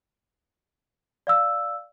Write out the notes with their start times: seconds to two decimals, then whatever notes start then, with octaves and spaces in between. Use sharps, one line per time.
1.27 D5 F5 E6